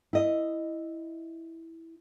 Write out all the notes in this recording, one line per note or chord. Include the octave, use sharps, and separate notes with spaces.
E4 D#5